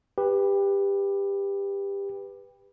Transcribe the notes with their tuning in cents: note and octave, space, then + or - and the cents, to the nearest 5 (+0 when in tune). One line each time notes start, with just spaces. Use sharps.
G4 +20 B4 +0